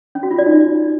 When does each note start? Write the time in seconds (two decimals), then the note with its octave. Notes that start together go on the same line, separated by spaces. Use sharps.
0.15 C#4
0.23 F#4
0.31 F4
0.38 D5
0.46 D#4